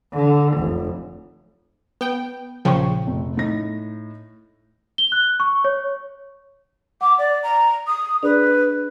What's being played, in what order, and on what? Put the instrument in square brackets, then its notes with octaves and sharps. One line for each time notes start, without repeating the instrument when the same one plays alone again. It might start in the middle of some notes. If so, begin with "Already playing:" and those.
[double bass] D3
F1
[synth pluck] B3 G5
[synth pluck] A#1 C#3 F3 [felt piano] G5 C#6
[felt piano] F1
A2 D#4 A#6
[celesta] G7
F#6
C#6
C#5
[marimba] F#5 [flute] D6
[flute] D5
A#5
D#6
[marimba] D4 G#4 D5 [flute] B4